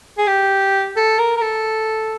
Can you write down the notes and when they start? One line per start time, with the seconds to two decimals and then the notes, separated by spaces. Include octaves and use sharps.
0.18 G#4
0.27 G4
0.96 A4
1.19 A#4
1.37 A#4
1.42 A4